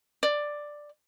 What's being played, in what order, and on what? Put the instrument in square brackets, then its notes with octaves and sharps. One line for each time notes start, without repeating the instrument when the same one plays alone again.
[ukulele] D5